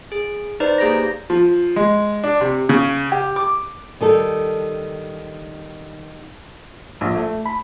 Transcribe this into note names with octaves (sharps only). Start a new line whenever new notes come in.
G#4
D#4 B4 C5 D5
A#3 G4 G#4 A#5 G6 A#6
F3
G#3
D4
C3
C#3
G4
D6
D#3 G3 A4
A#1
A3
B5